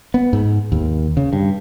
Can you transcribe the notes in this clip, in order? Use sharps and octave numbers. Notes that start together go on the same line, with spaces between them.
B3
G#2
D#2
C#3
G2